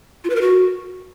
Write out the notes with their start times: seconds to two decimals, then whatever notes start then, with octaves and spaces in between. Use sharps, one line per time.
0.24 F4
0.30 B4
0.35 A#4
0.41 F#4